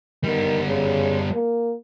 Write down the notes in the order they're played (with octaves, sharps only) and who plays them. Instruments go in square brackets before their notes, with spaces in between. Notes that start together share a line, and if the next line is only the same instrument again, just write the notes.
[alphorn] D#3 [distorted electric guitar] G3 B3
[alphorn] C#3
A#3